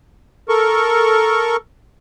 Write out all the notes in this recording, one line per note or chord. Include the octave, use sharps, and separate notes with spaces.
A4 A#4 C#6